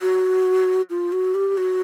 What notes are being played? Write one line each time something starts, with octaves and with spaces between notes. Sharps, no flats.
F#4
F4
F#4
G4
F#4